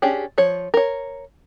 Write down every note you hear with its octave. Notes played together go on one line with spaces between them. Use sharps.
C#4 D4 G4 G#4
F3 C#5
A#4 C#5